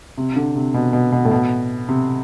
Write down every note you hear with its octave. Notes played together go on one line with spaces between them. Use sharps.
C3
D3
C3
B2
B2
B2
A2
B2
C3